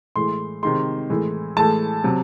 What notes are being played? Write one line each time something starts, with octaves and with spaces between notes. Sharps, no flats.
A2 E3 G#3 C6
C3 D#3 G#3 C6
A2 E3 G#3
A2 E3 G#3 A5
C3 F#3